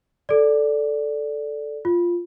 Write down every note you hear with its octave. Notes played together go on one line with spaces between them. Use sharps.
A4 D5
F4